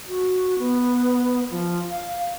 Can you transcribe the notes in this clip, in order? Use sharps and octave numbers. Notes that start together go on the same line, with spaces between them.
F#4
B3
F3
F5